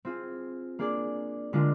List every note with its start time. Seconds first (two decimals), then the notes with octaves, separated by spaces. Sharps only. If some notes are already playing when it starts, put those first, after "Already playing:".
0.05 C4 F4 G#4
0.79 A#3 D4 G#4 D5
1.53 D3 G#3 D4 F4 A#4